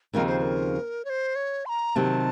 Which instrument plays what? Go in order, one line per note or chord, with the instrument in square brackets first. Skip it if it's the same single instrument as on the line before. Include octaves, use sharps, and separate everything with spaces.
[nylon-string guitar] D#2 C#3 F3 C4 D#4 [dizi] A#4
[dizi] C5
C5
A#4
C#5
C5
C#5
C6
A#5
[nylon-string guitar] C3 D#3 F#3 [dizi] A5